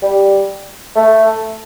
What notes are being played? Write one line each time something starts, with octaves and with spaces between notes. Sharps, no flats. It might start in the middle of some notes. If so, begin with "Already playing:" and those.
G3
A3